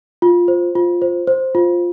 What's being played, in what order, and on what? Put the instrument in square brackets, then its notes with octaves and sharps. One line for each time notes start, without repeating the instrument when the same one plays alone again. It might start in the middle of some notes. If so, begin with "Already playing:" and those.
[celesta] F4
C5
F4
C5
C5
F4